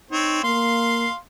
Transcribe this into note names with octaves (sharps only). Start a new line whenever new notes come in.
C4 D#4 C#5
A#3 F5 C6